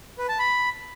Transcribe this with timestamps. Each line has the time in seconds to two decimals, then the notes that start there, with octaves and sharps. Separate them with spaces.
0.18 B4
0.29 A5
0.39 B5